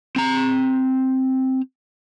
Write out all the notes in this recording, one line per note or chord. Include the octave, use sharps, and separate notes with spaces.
C4 A#5